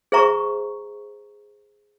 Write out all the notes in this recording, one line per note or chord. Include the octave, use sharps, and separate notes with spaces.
G#4 C5 E5 A#5 C#6